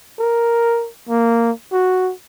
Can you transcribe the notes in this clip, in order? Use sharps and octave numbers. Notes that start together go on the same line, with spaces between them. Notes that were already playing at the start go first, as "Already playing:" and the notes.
A#4
A#3
F#4